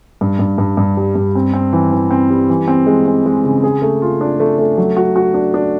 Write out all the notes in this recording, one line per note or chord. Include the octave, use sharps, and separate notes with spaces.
G2
G2
G2
G2
G3
G2
C4
C4
E3
E3
C4
G3
E3
C4
G#3
C4
G#3
C#3
G#4
A3
F4
D4
A3
A3
F#3
F#4
F#4
D4
D4